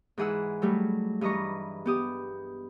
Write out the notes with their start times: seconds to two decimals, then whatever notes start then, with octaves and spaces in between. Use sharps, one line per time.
0.18 G#2 E3 G#4 F#5 E6
0.62 F#3 G3 A3
1.21 G2 E3 D#5 A#5 C#6
1.86 B3 G4 D#6